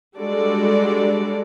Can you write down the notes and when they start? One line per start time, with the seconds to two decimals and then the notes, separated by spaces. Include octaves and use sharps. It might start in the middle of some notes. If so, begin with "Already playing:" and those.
0.19 G3 G#3 D4 F#4 A4 D5